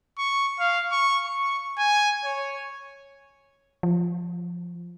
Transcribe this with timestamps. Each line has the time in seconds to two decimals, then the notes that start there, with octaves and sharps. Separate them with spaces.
0.18 C#6
0.60 F5
0.92 C#6
1.26 C#6
1.78 G#5
2.24 C#5
3.83 F3